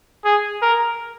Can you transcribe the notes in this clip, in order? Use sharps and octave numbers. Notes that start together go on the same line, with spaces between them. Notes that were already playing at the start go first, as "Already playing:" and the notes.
G#4
A#4